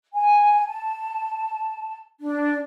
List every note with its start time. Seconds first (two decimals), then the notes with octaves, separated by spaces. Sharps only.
0.14 G#5
0.68 A5
2.20 D4